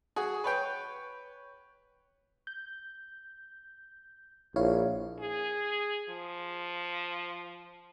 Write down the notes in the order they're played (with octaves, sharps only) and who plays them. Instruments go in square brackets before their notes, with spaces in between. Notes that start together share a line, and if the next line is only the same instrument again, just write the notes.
[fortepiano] F#4 G#4
B4 C#5 G5
[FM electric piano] G6
[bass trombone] A#1 [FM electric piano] E4 C#5 F5
[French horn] G#4
F3